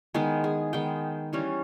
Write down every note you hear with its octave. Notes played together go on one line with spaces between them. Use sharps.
D#3 G#3 B3 G#4
G#4
D#3 G#3 B3 G5
E3 G3 C#4